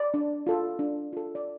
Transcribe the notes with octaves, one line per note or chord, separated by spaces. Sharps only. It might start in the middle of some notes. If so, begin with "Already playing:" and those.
Already playing: D5
D4
F4 A4
D4
F4 A4
D5